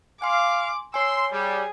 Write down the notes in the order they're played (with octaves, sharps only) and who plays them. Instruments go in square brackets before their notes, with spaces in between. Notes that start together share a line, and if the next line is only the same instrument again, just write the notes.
[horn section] F5 [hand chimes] G#5 C6 [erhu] D6
[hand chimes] C#5 G#5 [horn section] C6 [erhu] E6
[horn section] G3 [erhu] G#4